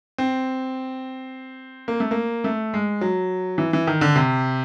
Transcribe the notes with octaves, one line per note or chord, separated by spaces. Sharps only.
C4
A#3
A3
A#3
A3
G#3
F#3
E3
E3
D#3
D3
C3